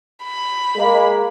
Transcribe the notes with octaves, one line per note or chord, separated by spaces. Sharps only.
B5
G#3 A#3